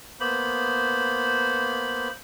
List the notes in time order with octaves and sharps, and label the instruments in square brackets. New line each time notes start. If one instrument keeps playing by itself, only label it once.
[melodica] A#3 B3 C5 B5